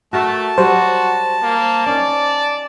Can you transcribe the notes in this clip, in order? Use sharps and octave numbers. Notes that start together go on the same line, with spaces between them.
A3 F#4 A#4 E5 A5
F#3 G3 F#4 C5
A#3
C#4 D#4 D5